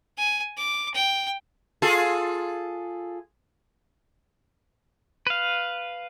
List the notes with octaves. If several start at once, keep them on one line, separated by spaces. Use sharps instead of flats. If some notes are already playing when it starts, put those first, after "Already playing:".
G#5
D6
G5
F4 G#4 A4
B4 F5